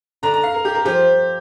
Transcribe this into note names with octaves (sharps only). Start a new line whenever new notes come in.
D3 A#5
A#5
F5
A#4
G4
A#4
F3 G4